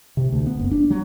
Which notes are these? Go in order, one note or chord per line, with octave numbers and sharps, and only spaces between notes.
C3
D2
B3
F#1
D4
F#3